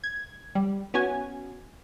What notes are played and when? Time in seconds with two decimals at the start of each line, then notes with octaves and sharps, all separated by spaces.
0.04 G#6
0.55 G3
0.94 B3 C#4 F#4 G#5